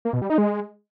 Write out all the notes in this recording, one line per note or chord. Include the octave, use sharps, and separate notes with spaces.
A#3
B2
G3
D#4
G#3